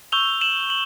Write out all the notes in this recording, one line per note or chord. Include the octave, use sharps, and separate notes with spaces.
C#6 E6 G6 F7 G7
E7 F#7
F#7